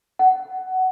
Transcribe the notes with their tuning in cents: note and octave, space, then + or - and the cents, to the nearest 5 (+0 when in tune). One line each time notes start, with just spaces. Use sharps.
F#5 +15